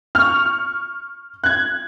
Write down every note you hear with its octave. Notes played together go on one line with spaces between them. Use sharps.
C#6 F6
F#6 G#6